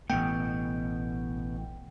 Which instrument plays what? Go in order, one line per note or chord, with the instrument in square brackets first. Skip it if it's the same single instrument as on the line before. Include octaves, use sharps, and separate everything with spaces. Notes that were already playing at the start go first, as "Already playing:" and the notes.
[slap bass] A1 A3 [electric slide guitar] B2 [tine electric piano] G5